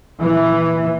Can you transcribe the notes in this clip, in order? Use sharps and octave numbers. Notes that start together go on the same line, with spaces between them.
A#2 E3